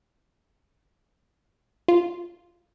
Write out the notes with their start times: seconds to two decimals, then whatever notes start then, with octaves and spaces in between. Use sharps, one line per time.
1.88 F4